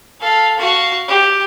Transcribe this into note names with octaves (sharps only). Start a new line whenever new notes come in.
A4 F5
F#4 F5
G4